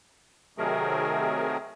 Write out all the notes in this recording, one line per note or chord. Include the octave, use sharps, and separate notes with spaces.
C3 D#3 F#3 A3 G#4 A#4